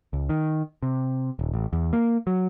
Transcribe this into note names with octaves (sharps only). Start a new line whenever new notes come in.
C#2
D#3
C3
D#1
A1
E2
A#3
F#3